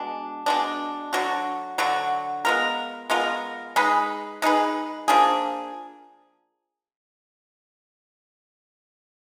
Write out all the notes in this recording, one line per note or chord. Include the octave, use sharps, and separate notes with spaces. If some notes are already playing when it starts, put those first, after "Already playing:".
Already playing: B2 G#3 D4
B2 G#3 D4
D3 F#3 D4 F#4
D3 F#3 D4 F#4
G#3 B3 F4 A#4
G#3 B3 F4 A#4
G#3 D#4 G#4 B4
G#3 D#4 G#4 B4
F3 A#3 D4 G#4